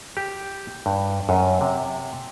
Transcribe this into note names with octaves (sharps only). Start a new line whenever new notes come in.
G4
G2
F#2
C3